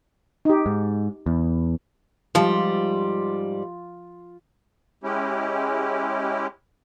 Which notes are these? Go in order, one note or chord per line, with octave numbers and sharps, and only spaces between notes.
D#4 G4
G#2
E2
G#2 F3 G3 F4 D#6
G#3 C#4 E4 G4